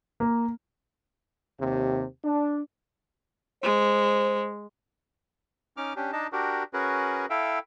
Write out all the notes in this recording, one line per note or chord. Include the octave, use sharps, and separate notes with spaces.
A#3
D#2 C3
D4
G#3 C5
C#4 D#4 D6 F6
C#4 D4 G4
D4 D#4 D#5 A5
D4 F#4 G4 A#4
C#4 F#4 G#4 A#4 B4
E4 A4 E5 F5 G5